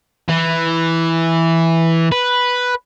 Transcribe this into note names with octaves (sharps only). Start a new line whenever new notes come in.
E3
B4